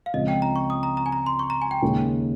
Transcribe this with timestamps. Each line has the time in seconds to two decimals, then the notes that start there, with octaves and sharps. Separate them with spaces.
0.06 F5
0.14 C#2 C#3 F3 C4 D#5
0.28 G5
0.42 A#5
0.56 C#6
0.70 D#6
0.83 A#5
0.97 A#5
1.06 G#5
1.12 A#5
1.26 C6
1.39 C#6
1.50 A#5
1.62 G#5
1.71 G5
1.82 D#2 C#3 G#3